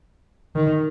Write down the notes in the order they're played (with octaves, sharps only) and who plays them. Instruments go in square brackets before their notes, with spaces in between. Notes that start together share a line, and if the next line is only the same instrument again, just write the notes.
[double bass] D#3